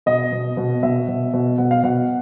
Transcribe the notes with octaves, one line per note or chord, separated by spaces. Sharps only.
B2 D#5
B2
B2
B2 E5
B2
B2
B2 F#5
F5
B2 F#5